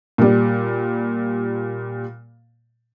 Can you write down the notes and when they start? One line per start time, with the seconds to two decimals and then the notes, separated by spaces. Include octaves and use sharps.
0.18 A#2 G3